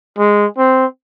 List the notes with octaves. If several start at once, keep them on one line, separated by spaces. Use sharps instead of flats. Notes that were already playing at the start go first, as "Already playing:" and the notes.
G#3
C4